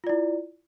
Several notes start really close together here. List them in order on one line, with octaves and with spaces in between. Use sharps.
F4 D5 E4